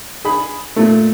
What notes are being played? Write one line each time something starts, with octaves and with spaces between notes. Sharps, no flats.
G#4 B5
A#2 A3